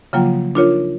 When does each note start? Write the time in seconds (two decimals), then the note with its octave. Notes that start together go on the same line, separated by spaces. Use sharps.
0.13 C#3 F3 F#3 A#3 F4 G5
0.55 D4 D#4 F4 A#4 C#5